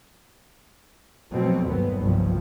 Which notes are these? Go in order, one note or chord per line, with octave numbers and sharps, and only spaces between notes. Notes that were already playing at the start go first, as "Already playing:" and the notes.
B2 F3 F#3 A3 C4
G1 D#2 F#3 B3
F#1 C2 G2 F3